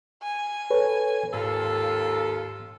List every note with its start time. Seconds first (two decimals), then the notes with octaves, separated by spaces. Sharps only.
0.23 G#5
0.70 A4 B4 C#5
1.34 D#2 G#2 F4 A4